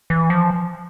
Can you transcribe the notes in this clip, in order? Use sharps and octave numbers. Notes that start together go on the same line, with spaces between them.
E3
F3